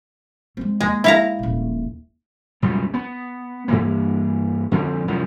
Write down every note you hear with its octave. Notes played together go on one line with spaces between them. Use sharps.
G#3 C4
D#2 G#3
E4 F5 A#5
D#1 A#1
C#2 F#2 B2 G3
B3
G2 E3 A#3
F2 D3 C4
C2 F#2 F3 G3